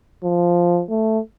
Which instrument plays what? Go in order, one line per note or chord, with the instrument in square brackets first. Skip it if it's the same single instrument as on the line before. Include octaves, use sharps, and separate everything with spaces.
[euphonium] F3
A3